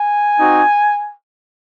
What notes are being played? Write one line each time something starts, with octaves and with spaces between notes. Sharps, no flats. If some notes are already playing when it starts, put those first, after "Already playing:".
Already playing: G#5
C4 D#4 F#4